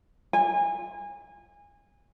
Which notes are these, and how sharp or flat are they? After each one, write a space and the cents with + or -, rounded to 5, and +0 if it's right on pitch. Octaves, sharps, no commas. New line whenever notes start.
G#5 -25